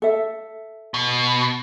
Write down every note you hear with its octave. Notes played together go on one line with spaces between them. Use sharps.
A4 E5
B2